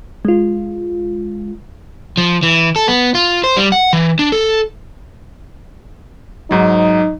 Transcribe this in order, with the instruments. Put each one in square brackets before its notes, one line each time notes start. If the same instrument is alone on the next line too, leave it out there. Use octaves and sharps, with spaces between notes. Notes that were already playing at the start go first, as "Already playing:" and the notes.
[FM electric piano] G#3 F4
[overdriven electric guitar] F3
E3
A4
B3
F4
C5
G3
F#5
E3
D4
A4
[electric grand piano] G#2 F#3 [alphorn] D#4